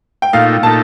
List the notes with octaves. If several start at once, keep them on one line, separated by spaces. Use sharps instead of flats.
G5
A#2 A3 D#4 F5
A#2 A3 D#4 A5